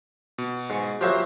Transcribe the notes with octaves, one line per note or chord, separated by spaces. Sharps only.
B2
G#2 C#6
F3 F#3 A#3 G4 C5 E5